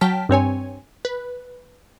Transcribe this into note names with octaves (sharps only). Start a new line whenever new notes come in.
F#3 G5 A5 F6 B6
G2 C4 C#5 G#5
B4